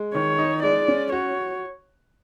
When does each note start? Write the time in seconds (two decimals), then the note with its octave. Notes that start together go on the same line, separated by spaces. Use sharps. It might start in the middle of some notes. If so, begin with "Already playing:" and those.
Already playing: G#3
0.14 D#3 C#5
0.38 D#4
0.63 G#3 D5
0.88 C#4
1.12 F#4 C#5